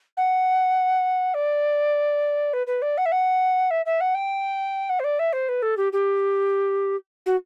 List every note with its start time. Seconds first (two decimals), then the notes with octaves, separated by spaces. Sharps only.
0.17 F#5
1.34 D5
2.53 B4
2.67 B4
2.82 D5
2.97 F#5
3.05 E5
3.12 F#5
3.70 E5
3.86 E5
4.00 F#5
4.14 G5
4.89 F#5
4.99 C5
5.04 D5
5.19 E5
5.33 C5
5.49 B4
5.62 A4
5.77 G4
5.92 G4
7.26 F#4